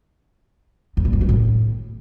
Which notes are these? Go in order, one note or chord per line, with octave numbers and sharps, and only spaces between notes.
E2
A#2
F#2
D#3
A2